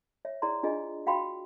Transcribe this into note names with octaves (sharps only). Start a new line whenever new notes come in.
C#5 E5
E4 G#4 D5 A#5 C6
D4 F4 G#4 D#5
F#4 F5 G5 B5 C6